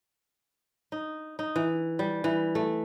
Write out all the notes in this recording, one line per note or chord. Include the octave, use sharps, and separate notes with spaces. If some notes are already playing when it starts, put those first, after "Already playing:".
D#4
D#4
E3
G3
E3
A3